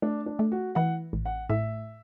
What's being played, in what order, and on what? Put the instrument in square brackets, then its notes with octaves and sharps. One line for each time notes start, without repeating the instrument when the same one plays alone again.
[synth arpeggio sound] A3 [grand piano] D4
[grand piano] D4
[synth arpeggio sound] A3
[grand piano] F#4
[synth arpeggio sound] E3 [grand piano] F#5
[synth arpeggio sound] A1
[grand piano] F#5
[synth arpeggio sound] A2 [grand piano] E5